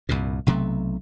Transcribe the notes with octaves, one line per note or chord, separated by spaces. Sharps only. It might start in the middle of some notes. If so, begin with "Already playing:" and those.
C2 G2 A#2
B1 C3 F#3 A3